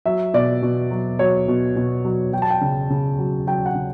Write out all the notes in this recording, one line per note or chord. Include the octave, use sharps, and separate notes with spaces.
F#3 E5
B2 D5
B2
F#3
F#3 C#5
B2
B2
F#3
F#3 G5
A5
G5
C#3
C#3
F#3
F#3 G5
F#5
C#3